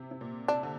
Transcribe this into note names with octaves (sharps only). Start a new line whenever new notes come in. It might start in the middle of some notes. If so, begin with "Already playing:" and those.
Already playing: C3
C3
A#2
C3 D4
D3